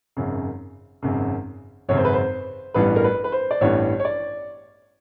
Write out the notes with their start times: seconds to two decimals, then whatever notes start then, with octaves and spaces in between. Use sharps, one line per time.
0.17 G#1 F#2 C#3
1.02 G#1 F#2 C#3
1.89 G#1 F#2 C#3 C#5
1.98 C5
2.05 B4
2.13 C5
2.74 A1 G2 E3 G3 B3 B4
2.96 A#4
3.04 B4
3.24 B4
3.32 C5
3.51 D5
3.61 A1 G2 E3 G3 B3 C#5
4.00 C#5
4.05 D5